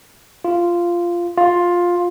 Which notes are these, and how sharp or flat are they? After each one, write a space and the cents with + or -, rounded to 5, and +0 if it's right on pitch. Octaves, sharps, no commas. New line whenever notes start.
F4 -10
F4 +10